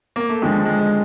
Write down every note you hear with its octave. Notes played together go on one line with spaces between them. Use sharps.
A#3
A3
D#2 D3 F3 G#3
G#3
G#3